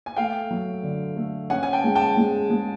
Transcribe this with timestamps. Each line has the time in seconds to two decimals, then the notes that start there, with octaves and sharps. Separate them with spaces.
0.06 G#5
0.16 A3 F5 G5
0.51 F#3
0.83 D3
1.17 A3
1.50 C#4 F#5 G#5
1.63 G#5
1.73 G5 A5
1.84 G#3
1.95 G5 A5
2.17 G#3
2.50 G#3